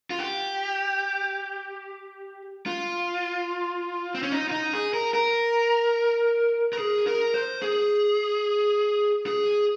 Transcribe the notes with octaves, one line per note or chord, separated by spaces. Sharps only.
F4
G4
F4
C4
C#4
D#4
F4
D#4
G#4
A#4
A#4
A#4
G#4
A#4
C5
G#4
G#4